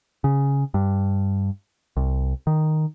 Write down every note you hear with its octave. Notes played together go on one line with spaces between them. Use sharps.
C#3
G2
C2
D#3